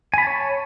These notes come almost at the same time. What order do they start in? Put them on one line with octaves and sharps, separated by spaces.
G#5 B5 A5 C#5